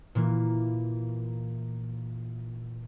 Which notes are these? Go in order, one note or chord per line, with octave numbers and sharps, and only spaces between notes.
A#2 E3 A#3